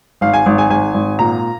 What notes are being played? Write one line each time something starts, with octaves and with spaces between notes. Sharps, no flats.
G#1 F5
G#5
G#1
G#5
G#1 G#5
G#1
A#2 A#5